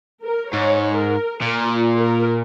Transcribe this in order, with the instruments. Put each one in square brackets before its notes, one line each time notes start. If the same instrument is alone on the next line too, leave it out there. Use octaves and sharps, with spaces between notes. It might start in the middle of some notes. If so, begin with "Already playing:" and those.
[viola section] A#4
[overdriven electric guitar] G#2 [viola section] C#5
[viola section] A#4
[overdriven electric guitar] A#2 [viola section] A#4
[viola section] F4
A#4